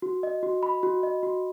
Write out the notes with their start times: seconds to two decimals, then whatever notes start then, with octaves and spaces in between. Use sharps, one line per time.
0.02 F#4
0.23 D#5
0.43 F#4
0.63 B5
0.83 F#4
1.03 D#5
1.23 F#4